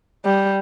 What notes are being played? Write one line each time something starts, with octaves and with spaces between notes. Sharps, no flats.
G3